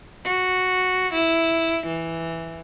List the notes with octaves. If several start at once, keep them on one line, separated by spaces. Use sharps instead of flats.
F#4
E4
E3